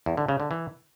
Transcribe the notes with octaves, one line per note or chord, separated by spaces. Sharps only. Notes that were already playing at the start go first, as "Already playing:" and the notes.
E2
D3
C#3
D3
E3